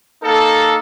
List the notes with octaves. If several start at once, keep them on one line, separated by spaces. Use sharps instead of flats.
A#3 D#4 A4